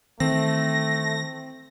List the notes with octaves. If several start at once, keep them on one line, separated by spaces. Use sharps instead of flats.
D#3 E3 A3 C4 A#6